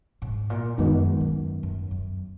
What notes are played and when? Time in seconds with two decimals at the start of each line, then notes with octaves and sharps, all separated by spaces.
0.22 G#2
0.50 A#2
0.78 F#2 D#3 G#3 B3 D#4
1.21 F#2
1.63 F#2
1.91 F#2